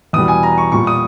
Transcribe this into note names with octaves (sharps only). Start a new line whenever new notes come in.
E2 B2 G3 D#6
G#5
A#5
C#6
A#2 G3 C#6
D#6